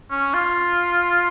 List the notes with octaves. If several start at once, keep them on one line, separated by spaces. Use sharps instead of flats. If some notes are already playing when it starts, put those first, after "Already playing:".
C#4
F4